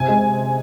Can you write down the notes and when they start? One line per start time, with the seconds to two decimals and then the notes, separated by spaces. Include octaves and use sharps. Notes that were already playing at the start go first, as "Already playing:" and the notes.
Already playing: C3 G#5
0.08 G#3